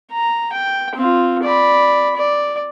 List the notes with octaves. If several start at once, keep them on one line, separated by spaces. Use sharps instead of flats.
A#5
G5
C4 F4
D5 B5
D5